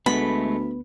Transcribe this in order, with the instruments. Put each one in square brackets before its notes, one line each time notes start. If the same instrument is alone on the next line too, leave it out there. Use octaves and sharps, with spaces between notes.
[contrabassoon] D2 [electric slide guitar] G#3 A3 [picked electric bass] B3 [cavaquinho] B5